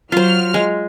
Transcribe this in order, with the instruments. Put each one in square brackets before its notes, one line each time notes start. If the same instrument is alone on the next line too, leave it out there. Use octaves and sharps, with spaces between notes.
[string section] F#3 F6 [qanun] F4 C5
[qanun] G#3